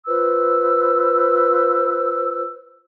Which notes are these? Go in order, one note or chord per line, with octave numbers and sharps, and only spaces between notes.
F4 B4 C5 E6